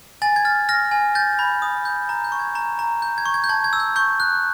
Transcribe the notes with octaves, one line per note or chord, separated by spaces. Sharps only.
G#5 A6
G#6
F6 A6
F6 A#6
G#5
G6 A6
B5 G#6
D#6
G6
A#5
G6
C#6
G#6
A#5
A#5
G6
G#6
C#6
G#6
G6
A5 G#6
G#6
E6
G6
C#6 G6
F#6